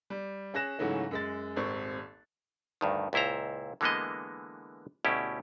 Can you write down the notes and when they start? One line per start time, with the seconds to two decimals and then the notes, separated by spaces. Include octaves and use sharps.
0.10 G3
0.54 C#4 G#4 F#6 A#6 E7
0.79 G#2 C#3 E3 F#3 A3 C#4
1.11 F#2 G#3 A6
1.56 D#1 G#1 C4 C#6
2.81 D2 G2 D#3
3.13 C#2 A#2 E4 C5 A#5
3.81 D3 E3 G#3 A#3 B3 D#5
5.05 D2 B2 C#4 E4 G4